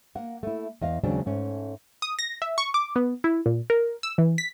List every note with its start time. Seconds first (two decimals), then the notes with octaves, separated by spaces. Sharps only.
0.15 A#3 F#5
0.43 A3 E4
0.81 E2 D#5 F5
1.03 D#2 C#3 F#3 G#3 C4 D4
1.26 G#2 A3 C#4
2.02 D#6
2.19 A#6
2.42 E5
2.58 C#6
2.74 D6
2.96 B3
3.24 E4
3.46 A#2
3.70 A#4
4.03 E6
4.18 E3
4.38 B6